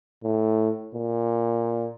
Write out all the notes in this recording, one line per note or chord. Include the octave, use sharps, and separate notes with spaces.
A2
A#2